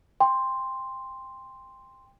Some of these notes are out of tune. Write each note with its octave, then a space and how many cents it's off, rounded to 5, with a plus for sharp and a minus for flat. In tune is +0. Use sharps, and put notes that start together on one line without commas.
G5 +25 C6 +0